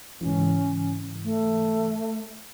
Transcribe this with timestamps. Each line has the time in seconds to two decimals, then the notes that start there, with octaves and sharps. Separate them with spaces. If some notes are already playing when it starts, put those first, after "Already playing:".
0.21 G#2 C#3 E3 C#4
1.24 A3